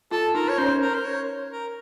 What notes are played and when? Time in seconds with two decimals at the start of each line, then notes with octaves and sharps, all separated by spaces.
0.11 F4 A4
0.35 D#4 A#4
0.49 C#5
0.58 C#4 C5
0.81 A#4
0.94 C5
1.05 C#5
1.50 A#4